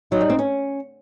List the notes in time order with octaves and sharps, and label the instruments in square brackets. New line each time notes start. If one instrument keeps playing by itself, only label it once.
[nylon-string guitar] F#3 [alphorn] D#4
[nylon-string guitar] G3
C4
C#4